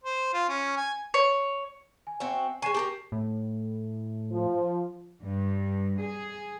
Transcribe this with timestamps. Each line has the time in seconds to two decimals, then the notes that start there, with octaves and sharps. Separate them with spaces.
0.04 C5
0.34 F4
0.49 C#4
0.77 G#5
1.14 C#5
2.07 G#5
2.20 C4 F#4 E5
2.62 G#3 G#5 C#6 C7 E7
2.74 G4 A4 A#4
3.12 A2
4.32 F3
5.22 G2
6.01 G#4